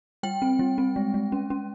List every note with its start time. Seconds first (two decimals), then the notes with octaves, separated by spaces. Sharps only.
0.23 G3 G5
0.42 C4
0.59 G3
0.78 C4
0.96 G#3
1.14 G#3
1.32 C#4
1.50 C#4